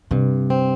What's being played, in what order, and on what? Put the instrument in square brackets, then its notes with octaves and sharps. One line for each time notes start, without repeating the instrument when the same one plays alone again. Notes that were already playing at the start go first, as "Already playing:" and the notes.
[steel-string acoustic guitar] G2 [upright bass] C3
[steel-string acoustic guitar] C4